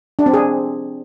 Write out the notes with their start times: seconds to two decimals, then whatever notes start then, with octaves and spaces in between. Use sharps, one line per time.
0.19 D4
0.26 C4
0.34 G#4